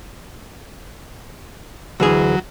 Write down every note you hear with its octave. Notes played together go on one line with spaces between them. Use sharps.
D2 E3 F#3 G#4